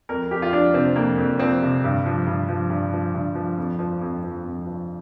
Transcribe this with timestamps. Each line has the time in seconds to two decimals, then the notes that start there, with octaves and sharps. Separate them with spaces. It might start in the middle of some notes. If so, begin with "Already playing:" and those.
0.09 F2 A#4
0.31 F2 G4
0.42 F4
0.52 F3 D4
0.74 C3 C4
0.96 F2 A#3
1.18 F2
1.39 F3 C4
1.62 C3
1.84 G2
2.06 F3
2.27 G2
2.49 F3
2.70 G2
2.93 F3
3.14 G2
3.35 F3
3.58 F2
3.79 F3
4.02 F2
4.23 F3
4.44 F2
4.66 F3